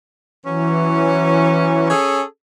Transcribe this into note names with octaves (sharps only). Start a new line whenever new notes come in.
E3 F#3 C#4
C#4 G#4 A4